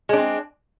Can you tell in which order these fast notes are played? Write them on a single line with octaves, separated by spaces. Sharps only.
G#3 D4 C4